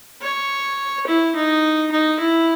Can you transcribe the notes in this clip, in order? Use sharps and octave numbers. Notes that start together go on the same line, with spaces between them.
C#5
E4
D#4
D#4
E4